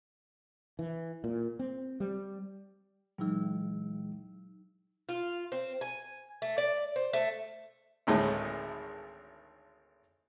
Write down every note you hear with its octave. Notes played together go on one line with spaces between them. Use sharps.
E3
A#2
C4
G3
A#2 E3 F#3 G#3 D#4
F4
C4
G#5
A3
D5
C5
A3
G#1 D2 A2 G#3